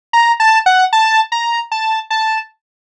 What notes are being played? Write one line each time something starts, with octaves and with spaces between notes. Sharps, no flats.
A#5
A5
F#5
A5
A#5
A5
A5